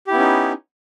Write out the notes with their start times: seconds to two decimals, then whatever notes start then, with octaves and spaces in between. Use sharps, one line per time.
0.07 G4
0.10 E4
0.14 B3
0.17 C#4
0.20 D#4